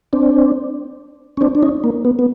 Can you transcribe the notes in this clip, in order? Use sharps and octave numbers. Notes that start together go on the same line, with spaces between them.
C4 D4
C#4
C4 D4
D4
C#4 D#4
A#3
B3
B3